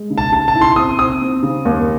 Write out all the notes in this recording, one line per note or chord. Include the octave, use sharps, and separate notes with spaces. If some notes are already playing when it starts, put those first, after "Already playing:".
Already playing: G#3
C#3
A5
C#3 A5
A5
E4
C6
C4 D#6
C4 D#6
C4
C#3
D#2